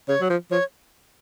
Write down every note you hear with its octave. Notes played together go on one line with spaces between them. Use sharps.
C#3 C#5
F#3
F3
F3 C#5